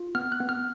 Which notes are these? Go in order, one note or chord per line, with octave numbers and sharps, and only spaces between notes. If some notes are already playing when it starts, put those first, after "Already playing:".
Already playing: F4
B3 F6
F#6
B3
F6